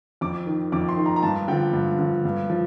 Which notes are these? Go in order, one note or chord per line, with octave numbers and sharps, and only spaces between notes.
F2 D6
D#3
F2 D6
C6
D#3
A#5
A#5
G2 A5
D3 F3 G5
G2
D3 F3
G2
F3